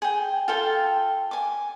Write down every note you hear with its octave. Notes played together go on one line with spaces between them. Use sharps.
G#4 G5
F4 A4 G5
G#5 D6